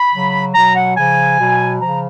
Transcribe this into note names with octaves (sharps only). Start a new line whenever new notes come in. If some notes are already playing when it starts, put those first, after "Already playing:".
Already playing: B5
C#3 F#3
B2 F#3 A#5
F#5
C#3 F3 G#5
B2 F#3
C#3 F3 A#5